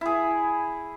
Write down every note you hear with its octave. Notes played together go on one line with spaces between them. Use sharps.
E4 G#4